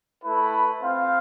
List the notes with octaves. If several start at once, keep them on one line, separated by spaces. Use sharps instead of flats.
A3 E4 B4
C4 F4 C5 F5